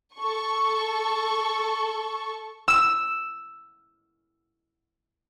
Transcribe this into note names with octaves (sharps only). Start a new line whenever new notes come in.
A4 C#6
E6 E7